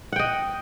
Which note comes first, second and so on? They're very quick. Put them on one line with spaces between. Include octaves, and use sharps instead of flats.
F#5 G5 D#5